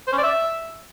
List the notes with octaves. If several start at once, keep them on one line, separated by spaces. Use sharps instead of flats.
C5
C#4
D5
E5